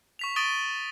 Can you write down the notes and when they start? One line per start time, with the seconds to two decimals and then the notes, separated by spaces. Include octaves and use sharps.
0.19 C#6 B6 F7
0.36 C#6 D#6 A6 D7 D#7 G7